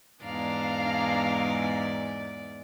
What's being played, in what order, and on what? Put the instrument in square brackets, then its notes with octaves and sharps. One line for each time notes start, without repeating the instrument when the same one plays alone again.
[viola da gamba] E2 G#2 D5 [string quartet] D4 F5 A#5